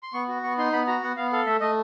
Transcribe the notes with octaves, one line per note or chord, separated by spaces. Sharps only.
C6
B3 C#6
F#4
B3 C#6
D#4 C6
B3 B5
F#4 A#5
B3 F#5
B3 F5
A4 F5
A3 E5
A3 D#5